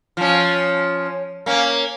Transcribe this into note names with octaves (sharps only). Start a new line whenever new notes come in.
F3 C#4
A#3 C#4